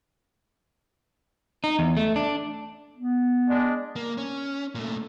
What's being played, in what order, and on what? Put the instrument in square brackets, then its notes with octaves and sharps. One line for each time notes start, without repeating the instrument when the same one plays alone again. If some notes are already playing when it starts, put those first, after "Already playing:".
[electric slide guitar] D#4
E2
A3
D4
[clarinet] B3
[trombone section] G#3 D4
[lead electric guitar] A#3
C#4
A#2 A3